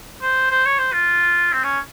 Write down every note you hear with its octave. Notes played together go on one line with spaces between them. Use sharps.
C5
C5
C#5
C5
F4
C4
C#4